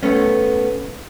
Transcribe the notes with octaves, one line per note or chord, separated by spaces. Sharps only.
A3 B3 C#4